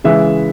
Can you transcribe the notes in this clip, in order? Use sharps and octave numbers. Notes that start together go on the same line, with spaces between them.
C#3 E3 G#3 E5